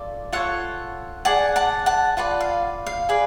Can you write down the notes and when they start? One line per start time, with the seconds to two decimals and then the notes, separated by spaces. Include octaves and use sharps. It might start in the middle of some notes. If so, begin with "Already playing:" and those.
Already playing: F4 A4 D5
0.32 F4 A4 C#5 F#5
1.25 G#4 D5 F#5 A5
1.56 F#5 A5
1.86 F#5 A5
2.17 F4 B4 D5 F#5
2.41 F5
2.86 F5
3.09 G#4 B4 D5